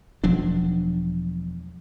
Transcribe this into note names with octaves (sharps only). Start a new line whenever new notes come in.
E1 F3 F#3 D4